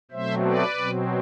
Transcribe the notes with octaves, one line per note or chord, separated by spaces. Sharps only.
B2 F#3 A3 C4 C5 E5
B4 D5
B2 F#3 C4